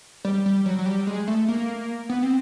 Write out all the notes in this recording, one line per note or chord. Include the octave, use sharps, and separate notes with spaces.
G3
G3
F#3
F#3
G3
G#3
A3
A#3
B3
C4